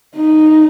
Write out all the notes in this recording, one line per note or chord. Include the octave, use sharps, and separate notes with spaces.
D#4